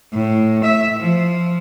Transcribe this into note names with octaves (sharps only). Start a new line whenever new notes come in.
A2
E5
F3